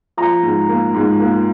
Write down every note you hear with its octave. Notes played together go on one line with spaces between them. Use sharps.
F3 A#5
G#2
A#3
G#2
A#3